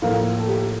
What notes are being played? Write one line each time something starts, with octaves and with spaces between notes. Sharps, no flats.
A2 F3 A#3 F4
A4
G4